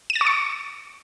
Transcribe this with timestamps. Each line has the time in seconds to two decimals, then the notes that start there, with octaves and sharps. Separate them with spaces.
0.10 D#7
0.15 A6
0.21 C#6
0.27 C#7